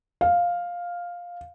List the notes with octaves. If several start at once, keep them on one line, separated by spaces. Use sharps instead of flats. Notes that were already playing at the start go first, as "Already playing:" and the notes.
F5